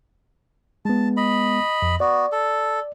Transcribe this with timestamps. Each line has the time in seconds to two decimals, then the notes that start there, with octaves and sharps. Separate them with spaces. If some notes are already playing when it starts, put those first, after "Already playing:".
0.85 G#3 B3 A5
1.17 D#5 B5
1.82 F2
2.00 B3 F#4 D5
2.32 A4